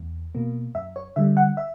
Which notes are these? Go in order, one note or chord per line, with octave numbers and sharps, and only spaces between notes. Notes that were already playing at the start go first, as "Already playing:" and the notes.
Already playing: E2
B2 A#3
F#2 E5
C#5
D3 G3 E5
F#5
E5